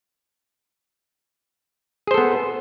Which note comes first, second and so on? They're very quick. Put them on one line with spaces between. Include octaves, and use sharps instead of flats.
G#4 C5 A4 B3